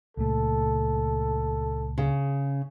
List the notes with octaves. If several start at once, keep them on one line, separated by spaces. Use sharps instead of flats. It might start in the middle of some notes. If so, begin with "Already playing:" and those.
C#2 A#2 A3 A4
C#3